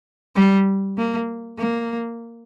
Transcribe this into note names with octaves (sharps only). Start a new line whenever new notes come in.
G3
A#3
A#3